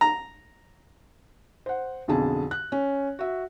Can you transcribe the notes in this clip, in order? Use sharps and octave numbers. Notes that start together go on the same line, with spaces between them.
A#5
C5 F#5
B1 F2 D3 G#4 A5
F#6
C#4
F#4 E5